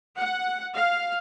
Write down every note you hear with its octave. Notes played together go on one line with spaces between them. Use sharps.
F#5
F5